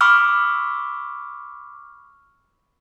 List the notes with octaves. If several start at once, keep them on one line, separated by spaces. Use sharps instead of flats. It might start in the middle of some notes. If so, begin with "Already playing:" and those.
B5 C#6 D6 E6 F6